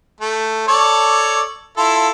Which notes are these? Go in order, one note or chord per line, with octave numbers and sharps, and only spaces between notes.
A3
A4 C#5 D5
E4 F4 A4